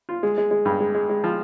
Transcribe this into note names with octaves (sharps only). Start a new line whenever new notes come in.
F4
G#3
G#3
G#3
G2
G#3
G#3
G#3
F3